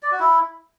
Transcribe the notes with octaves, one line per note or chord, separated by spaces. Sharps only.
D5
F#4
E4